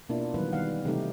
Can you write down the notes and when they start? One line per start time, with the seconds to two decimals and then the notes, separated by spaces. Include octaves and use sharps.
0.09 B2 A#3 D4 E4 F4
0.34 D#3 E3 F#3 G3 B3 B4
0.53 D#3 G3 B3 F5 F#5
0.85 C3 E3 G3 A3 D#4 G4